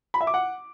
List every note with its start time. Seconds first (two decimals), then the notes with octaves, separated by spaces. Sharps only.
0.14 B5
0.21 E5
0.27 D6
0.34 F#5